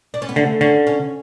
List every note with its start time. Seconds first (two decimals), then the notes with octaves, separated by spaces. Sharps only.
0.14 D4
0.22 C#4
0.29 B3
0.36 D3 A3
0.61 D3 C#4
0.87 C#4